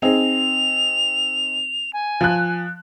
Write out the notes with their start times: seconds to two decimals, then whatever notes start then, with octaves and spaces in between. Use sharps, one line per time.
0.02 C4 D#4 G#4 F7
1.93 G#5
2.21 F3 F#6